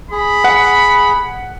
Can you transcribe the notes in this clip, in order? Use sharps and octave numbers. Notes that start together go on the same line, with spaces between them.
G#4 B5
F#5